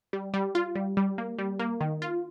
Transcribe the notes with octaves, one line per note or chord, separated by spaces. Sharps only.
G3
G3
F4
G3
G3
A#3
G3
A#3
D#3
F4